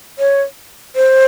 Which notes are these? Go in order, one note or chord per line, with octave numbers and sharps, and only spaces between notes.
C#5
C5